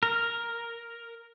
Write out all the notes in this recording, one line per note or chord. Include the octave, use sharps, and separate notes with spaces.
A#4